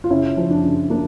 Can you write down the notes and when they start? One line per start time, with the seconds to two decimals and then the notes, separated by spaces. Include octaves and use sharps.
0.04 F4
0.10 C#3 C#4 E4
0.37 F3
0.50 D4
0.64 C#3
0.90 A#3 D4